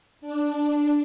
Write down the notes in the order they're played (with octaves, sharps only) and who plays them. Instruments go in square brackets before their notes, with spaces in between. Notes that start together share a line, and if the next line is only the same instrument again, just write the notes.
[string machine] D4